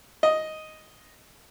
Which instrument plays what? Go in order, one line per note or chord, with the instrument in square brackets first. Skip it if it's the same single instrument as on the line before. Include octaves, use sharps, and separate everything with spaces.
[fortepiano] D#5